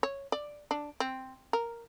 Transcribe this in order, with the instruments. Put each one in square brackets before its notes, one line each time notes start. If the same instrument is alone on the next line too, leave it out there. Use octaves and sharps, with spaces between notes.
[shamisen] C#5
D5
D4
C4
A#4